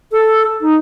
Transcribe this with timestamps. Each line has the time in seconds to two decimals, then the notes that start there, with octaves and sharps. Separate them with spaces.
0.12 A4
0.61 D#4